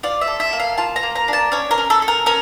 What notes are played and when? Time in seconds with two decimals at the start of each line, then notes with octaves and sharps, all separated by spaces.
0.03 F4 D5
0.21 E5
0.27 A4
0.40 E5
0.53 A#3
0.59 F5
0.78 F4 A5
0.96 A#5
1.03 A#3
1.15 A#5
1.28 D4
1.33 A5
1.52 C#4 C#5
1.71 A#4
1.78 C#4
1.90 A4
2.02 A4
2.08 A#4
2.26 C#4 A#4